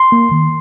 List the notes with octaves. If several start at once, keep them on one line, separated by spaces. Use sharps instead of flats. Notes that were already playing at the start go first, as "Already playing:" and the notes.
Already playing: C6
A#3
D#3